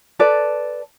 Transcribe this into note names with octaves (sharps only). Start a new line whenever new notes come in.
A4 B4 D5